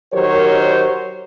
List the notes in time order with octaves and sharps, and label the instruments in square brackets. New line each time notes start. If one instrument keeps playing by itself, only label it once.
[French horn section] D#3 F#3 G4 A#4 C5 C#5